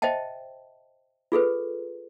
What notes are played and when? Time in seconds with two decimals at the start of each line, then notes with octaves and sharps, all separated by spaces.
0.02 C5 D#5 E5 G5 A5
1.32 F4 G#4 A4 B4